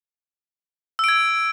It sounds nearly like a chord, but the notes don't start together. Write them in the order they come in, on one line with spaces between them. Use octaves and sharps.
E6 D7 G#6